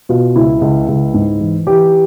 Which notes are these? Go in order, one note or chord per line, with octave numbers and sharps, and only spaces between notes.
B2 F4
C#2 E4
C#2
C#2
G#2
E3
E3 G4